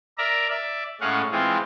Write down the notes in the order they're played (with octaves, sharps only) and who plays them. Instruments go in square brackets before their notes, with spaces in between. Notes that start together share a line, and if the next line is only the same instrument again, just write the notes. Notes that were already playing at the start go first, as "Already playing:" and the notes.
[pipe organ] A#4 D5 E5 A#5
D5 E5
A2 G#3 C#4 F5 F#5
E3 G#3 C4 F4